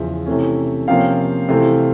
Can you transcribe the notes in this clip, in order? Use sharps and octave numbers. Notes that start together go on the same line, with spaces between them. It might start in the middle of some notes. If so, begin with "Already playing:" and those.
Already playing: E2 C#3 F3 E5
C3 E3 A3 C#4
C3 F3 A#3 C#4 F5 G5
C3 E3 A3 C4